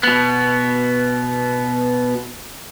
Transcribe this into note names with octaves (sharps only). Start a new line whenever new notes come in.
B2 B3